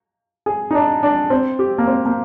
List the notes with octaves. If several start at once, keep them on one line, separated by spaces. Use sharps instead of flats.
G#4
D#4
D4
D4
C4
G4
A#3
C4
A#3